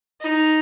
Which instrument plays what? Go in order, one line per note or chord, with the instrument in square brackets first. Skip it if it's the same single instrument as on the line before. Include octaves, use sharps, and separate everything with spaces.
[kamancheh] D#4